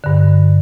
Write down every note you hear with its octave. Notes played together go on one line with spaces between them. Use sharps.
G2 D3